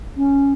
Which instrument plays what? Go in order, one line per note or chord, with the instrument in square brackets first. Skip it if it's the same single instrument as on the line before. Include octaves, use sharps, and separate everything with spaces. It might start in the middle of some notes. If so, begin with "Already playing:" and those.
[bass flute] C#4